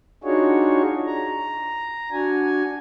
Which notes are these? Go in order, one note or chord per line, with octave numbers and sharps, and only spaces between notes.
D4 D#4 F4 F#4 G#4 C#5
A#5
D4 F#4 G#5